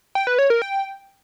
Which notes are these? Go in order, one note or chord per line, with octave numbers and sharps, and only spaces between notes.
G5
B4
C#5
A#4
G5